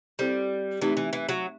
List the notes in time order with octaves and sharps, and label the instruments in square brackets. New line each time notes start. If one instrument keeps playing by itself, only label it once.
[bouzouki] G3 [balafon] C4 E4 A4 C5
[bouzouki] E3 [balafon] A3 C4 D#4 G4
[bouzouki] E3
E3
F#3